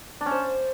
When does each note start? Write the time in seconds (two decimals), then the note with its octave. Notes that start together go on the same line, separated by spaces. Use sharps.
0.21 D4
0.26 C#4
0.31 C5